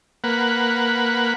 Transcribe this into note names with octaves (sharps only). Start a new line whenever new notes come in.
A#3 B4 F#5